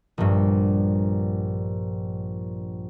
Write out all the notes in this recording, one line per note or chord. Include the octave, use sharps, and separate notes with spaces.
A#1 G2